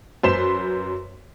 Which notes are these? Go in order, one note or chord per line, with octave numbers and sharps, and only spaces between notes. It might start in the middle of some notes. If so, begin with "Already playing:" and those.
F#2 B4 C5 C6 B6 E7